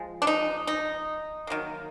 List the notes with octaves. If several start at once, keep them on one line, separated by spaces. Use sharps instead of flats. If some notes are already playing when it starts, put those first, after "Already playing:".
Already playing: F3 G#3
D4
D#4
D#4
D#3 F#3 A#3